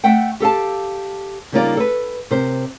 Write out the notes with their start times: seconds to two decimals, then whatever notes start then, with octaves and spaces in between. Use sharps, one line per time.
0.04 A3 E5 F#5 G5
0.40 G4 A4 F5 A5
1.52 C#3 G3 A#3 D#4 F4 D5
1.77 A4 B4
2.31 C3 A#4 C5